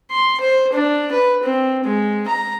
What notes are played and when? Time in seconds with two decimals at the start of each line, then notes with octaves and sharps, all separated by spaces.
0.11 C6
0.40 C5
0.73 D4
1.12 B4
1.44 C4
1.85 G#3
2.28 A#5